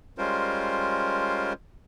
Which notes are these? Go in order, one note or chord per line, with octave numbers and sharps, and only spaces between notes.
G3 G#3 C#4 F4 A#4 C5